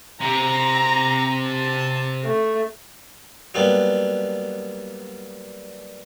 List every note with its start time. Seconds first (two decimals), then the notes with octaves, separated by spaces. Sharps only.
0.21 C3 C4 A#5
1.47 A5
2.24 A3
3.54 F#3 G3 A#3 B3 D4